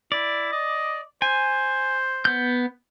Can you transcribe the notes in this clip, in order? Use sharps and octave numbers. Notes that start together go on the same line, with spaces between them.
E4 D5
D#5
C5 G#5
B3 G6